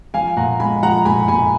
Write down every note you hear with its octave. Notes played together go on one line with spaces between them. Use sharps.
F3 F5 G#5
A#2 F#5 A#5
G#3 G#5 B5
F3 F#5 A#5
A#2 G#5 B5
A#2 G#5 B5